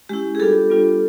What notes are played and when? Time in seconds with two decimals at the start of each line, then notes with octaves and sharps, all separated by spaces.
0.09 G#3 C#4 E4 G4
0.35 G#4
0.39 G3 B3 D4 F4 G4 A4
0.70 G3 B3 D4 F4